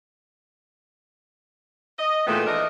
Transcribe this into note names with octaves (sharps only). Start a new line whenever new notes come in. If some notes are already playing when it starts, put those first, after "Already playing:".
D#5
A#2 D#3 E3 G#3 A3 B3
E3 A3 D4 A#4 D#5